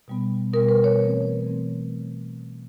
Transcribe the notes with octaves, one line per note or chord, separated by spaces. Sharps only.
B2 G3 B3
B2 G3 B3 A#4
B4
C#5
E3 A3 C4
E3 A3 C4